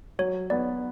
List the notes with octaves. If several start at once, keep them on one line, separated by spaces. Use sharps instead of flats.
F#3 C#5
B3 D5